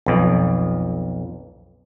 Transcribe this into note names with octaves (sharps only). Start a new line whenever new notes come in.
B1 F2